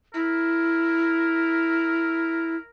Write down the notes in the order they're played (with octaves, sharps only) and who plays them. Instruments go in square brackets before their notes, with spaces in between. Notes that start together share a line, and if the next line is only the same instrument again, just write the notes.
[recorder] E4 [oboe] A#4